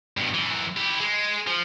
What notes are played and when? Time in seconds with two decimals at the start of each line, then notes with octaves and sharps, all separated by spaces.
0.17 G2 B2
0.34 F#2 E3
0.77 E4 G4
1.01 G#3
1.47 F3